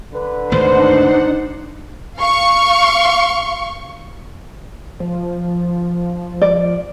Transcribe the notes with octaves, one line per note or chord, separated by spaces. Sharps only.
D3 B4
G#1 D2 D4 D#4 C5 F#5
F5 C#6
F3
D5